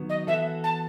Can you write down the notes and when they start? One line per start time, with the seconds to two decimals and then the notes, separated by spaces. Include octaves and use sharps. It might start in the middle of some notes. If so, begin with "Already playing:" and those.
Already playing: D#3 F#3 B3
0.10 D#5
0.27 E3 B3 F#4 A4 E5
0.64 A5